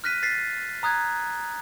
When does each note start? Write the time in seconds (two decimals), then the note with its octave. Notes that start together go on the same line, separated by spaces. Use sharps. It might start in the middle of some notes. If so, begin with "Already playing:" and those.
0.04 F6 F#6 A#6 B6 D#7
0.23 A6 B6 C7
0.83 A#5 D#6 F#6 G#6